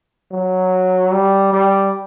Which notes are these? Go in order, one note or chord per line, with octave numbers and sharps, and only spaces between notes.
F#3
G3
G3